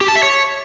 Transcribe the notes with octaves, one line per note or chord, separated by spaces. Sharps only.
G4
A5
E5
C#5